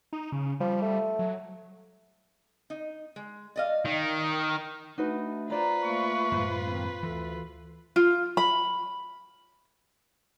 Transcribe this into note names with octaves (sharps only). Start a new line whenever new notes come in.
D#4
C#3
F3 G3
A3
F#3
D#4
G#3
D5 D#5 F5
D#3
A3 D4 D#4 F#4 B4
F4 B4 C5 D5 A#5
A3 A#3 C#6
F#2 A2 G#3 C5
D#3 A#3 C4
D2 E3 A4
F4
B5